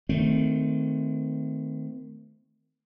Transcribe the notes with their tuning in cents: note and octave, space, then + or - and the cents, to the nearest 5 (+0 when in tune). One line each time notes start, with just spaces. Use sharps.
D#3 +0 A3 +0 C4 -20